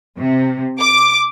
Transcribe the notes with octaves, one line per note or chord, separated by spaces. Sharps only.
C3
D6